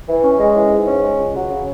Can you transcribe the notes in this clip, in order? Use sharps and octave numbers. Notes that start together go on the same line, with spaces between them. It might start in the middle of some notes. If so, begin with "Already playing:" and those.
E3
C#4
G#3
E3
G#2
C#4
G#3
C#2
F#3
C#3